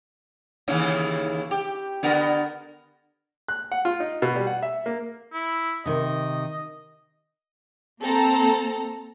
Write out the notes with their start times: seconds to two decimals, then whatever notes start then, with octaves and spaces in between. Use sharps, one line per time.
0.68 D#2 C#3 E3
1.51 G4
2.03 D3 B3 A#4
3.48 F#6
3.72 F#5
3.85 F4
4.00 D#4
4.22 B2
4.36 G3
4.47 F#5
4.63 E5
4.86 A#3
5.33 E4
5.86 C3 D#3 D#5
8.01 A#3 C4 A4 A#5